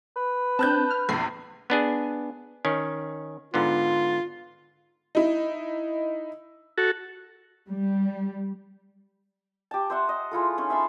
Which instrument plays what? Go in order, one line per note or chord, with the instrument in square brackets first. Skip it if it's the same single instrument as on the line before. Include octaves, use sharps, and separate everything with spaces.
[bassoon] B4
[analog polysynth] C4 D4 [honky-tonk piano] A5 F#6 G6
[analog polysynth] F6
[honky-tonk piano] A#1 E2 [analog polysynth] C7
[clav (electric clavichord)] B3 D4 G#4
D#3 C#4
[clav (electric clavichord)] G#2 D3 B3 [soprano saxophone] F4
[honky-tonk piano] D#4 E4
[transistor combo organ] F#4 A4
[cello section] G3
[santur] G4 A5
C5 E5 F#5
D#5
G#3 E4 F4 A4
C#4 D#4
E5 A5 B5 C6